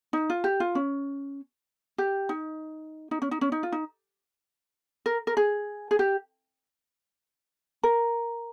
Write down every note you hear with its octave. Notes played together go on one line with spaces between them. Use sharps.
D#4
F4
G4
F4
C#4
G4
D#4
D#4
C#4
D#4
C#4
D#4
F4
D#4
A#4
A#4
G#4
G#4
G4
A#4